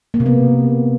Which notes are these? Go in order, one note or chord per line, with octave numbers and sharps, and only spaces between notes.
A#3
C3
B3